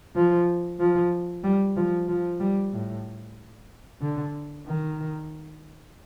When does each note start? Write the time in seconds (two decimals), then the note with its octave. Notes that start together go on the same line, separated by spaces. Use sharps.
0.16 F3
0.80 F3
1.44 G3
1.76 F3
2.08 F3
2.40 G3
2.73 A2
4.01 D3
4.66 D#3